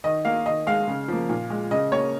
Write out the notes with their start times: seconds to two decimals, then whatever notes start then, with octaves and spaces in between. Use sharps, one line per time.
0.04 D#3 D#5
0.25 A#3 F5
0.46 D#3 D#5
0.67 G#3 F5
0.88 C#3
1.08 F3 A#3
1.29 A#2
1.50 G#3
1.71 C#3 D#5
1.92 A#3 C#5